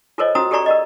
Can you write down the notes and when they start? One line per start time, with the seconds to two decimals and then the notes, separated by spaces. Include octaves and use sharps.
0.18 F4 A4 A#4 C5 C#5 D#5
0.35 C#4 F4 F#4 C5 A#5 D#6
0.51 G4 A4 C#5 D5 A#5 C#6
0.66 A#4 D5 D#5